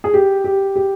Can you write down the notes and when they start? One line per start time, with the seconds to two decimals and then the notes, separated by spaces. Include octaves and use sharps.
0.04 G#4
0.14 G4
0.44 G4
0.76 G4